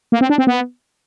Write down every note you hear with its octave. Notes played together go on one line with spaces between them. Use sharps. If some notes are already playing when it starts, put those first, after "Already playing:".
A#3
C4
D4
C4
B3